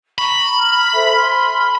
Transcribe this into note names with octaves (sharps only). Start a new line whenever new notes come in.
A#5 B5 C#6
A#5 F6
A4 C5 E5
G#5 C6 F6